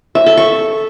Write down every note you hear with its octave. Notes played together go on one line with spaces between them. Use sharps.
E5
A4
C#6